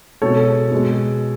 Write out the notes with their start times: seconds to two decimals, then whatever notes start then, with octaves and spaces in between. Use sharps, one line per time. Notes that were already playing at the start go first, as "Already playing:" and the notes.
0.22 B2 G#3 A4 C#5
0.71 B2 G#3